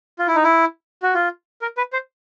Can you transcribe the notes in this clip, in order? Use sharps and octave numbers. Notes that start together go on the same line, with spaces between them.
F4
E4
D#4
E4
F#4
F4
A#4
B4
C5